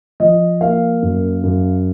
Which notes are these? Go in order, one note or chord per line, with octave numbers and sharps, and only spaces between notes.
F3 D#5
A#3 F5
F#2
F#2